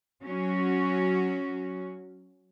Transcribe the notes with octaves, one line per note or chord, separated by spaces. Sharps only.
F#3 C#4 F#4